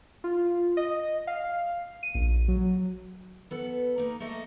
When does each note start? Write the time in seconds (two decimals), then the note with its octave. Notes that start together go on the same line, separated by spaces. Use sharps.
0.24 F4
0.77 D#5
1.27 F5
2.03 D#7
2.15 A#1
2.48 F#3
3.51 B3 A4 B4
3.98 A#3 D#4
4.20 A3 A#3 A4 D#5 E5